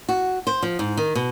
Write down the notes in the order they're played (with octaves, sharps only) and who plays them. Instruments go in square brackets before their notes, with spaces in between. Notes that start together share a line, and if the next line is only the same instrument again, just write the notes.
[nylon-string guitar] F#4
C5
F3
G#2
D#3
B2